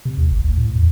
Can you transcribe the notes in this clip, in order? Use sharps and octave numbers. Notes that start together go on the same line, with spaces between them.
C3
D#2
G1
D2
A2
E2